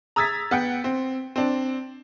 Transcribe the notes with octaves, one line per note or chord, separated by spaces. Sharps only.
A#5 D#6 E6 G#6 A6 B6
B3 F#5 G5
C4
C4 D4